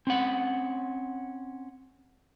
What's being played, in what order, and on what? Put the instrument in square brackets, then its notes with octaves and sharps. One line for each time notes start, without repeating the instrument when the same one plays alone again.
[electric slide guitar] C4 C#4 F#5